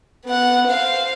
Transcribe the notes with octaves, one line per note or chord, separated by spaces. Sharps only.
B3 F#5
C5 F5